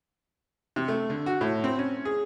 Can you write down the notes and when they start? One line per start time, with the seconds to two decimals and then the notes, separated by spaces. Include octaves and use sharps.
0.76 C3
0.88 A3
1.10 D3
1.26 F#4
1.41 A2
1.64 C4
1.79 C#4
2.05 G#4